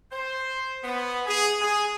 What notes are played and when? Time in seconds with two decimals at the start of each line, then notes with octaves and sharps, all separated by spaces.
0.12 C5
0.83 B3
1.26 G#4
1.61 G#4